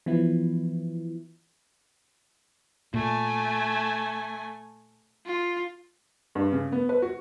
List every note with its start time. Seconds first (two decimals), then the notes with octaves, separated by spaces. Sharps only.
0.06 E3 F3 B3 E4
2.94 A#2 A3 G#5
5.26 F4
6.35 G2
6.53 C#3
6.72 B3
6.89 B4
7.02 F#4